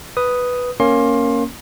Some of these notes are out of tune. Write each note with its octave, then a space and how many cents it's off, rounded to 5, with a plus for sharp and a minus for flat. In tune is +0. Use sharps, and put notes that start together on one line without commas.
B4 +0 D#6 +0
A#3 +0 C#4 +0 C6 +25